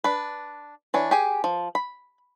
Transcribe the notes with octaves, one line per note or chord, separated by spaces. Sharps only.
D4 B4
E3 D4 C#5
G4 G#4 G#5
F3
B5